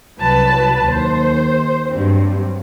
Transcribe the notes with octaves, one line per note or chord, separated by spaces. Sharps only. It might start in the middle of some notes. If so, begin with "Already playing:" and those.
C2 F#3 B4 A5
D#2 C5
G2 F#3 C4